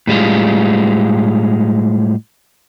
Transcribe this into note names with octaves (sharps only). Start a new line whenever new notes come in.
A2 G3 G#3 F4